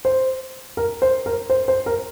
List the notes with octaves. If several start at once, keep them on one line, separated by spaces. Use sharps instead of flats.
C5
A#4
C5
A#4
C5
C5
A#4